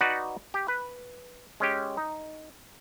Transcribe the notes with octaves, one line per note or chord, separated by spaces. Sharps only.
D#4 F#4 B4 D5 F#5
G4
B4
G#3 C#4 G4
D#4